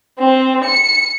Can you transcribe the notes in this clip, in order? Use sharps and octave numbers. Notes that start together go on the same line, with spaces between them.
C4
C#7